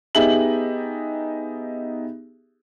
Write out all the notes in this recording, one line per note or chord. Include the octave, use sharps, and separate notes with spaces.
B3 D#4 G4 G#4 E5 F#7